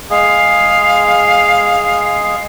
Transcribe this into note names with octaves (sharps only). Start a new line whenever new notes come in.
G#3 G#4 F5